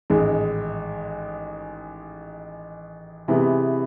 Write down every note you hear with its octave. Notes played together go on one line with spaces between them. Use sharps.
A1 G#2 D#3 G#3
C3 E3 G#3 B3